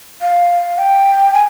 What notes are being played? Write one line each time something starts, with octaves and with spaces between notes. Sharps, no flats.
F5
G5
G#5